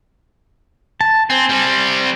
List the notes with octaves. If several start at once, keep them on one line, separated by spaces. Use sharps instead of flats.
A5
C4 G#5
G3 C4